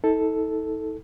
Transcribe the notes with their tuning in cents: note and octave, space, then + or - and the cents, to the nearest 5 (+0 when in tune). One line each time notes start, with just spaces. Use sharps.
D#4 +40 A4 +0